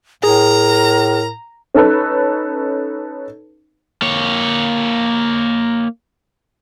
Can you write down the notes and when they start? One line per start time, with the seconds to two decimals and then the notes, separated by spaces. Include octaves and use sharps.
0.24 A2 G#4 A#4 A#5
1.75 C#4 D#4 A4 B4
4.02 A#3 C#5